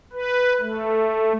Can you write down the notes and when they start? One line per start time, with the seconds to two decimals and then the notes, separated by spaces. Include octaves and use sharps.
0.13 B4
0.61 A3